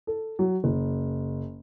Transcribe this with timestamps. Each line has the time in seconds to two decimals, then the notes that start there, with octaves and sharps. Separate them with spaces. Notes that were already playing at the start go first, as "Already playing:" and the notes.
0.07 A4
0.39 F#3
0.64 F#1